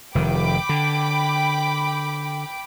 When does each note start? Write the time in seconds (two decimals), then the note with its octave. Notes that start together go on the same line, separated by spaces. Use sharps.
0.15 F1 D#3 G5 B5 D6
0.69 D3